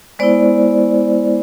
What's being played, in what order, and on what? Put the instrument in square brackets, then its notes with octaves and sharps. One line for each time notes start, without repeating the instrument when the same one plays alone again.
[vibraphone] G#3 B3 E4 C5 D5